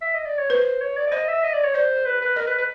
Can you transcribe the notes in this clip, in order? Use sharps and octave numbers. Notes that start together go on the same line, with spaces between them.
E5
D#5
D5
C#5
B4 C5
C#5
D5
D5
C5 D#5
E5
D#5
D5
C#5
C5 D5
B4
B4
A#4 D#5
B4
B4